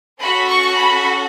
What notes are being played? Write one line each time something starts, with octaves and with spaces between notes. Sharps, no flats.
C#4 F#4 A4 B5
C#6
B5